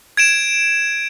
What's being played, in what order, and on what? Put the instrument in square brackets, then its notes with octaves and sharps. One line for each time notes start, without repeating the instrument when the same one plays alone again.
[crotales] G#6 D7 E7